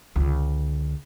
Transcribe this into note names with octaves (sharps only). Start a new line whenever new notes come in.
C#2 D3